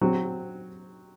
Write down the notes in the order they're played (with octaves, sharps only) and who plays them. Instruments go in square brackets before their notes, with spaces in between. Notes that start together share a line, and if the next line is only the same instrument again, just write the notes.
[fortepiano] F#3 C4 F#4